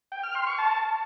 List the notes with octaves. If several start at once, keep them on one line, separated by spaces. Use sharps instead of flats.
G5
F6
C6
C#6
A5